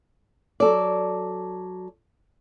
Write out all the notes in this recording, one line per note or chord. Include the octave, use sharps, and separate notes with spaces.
F#3 A4 D5